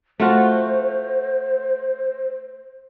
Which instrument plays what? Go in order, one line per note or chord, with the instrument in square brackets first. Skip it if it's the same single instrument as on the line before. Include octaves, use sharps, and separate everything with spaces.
[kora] A3 F4 F#4 [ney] C5